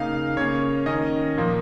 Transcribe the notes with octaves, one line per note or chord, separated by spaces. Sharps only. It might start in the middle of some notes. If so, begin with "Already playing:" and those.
Already playing: C#3 A#3 D#4 F5
C#3 A#3 C#4 C#5
D#3 C#4 D#5
A#2 F3 A#3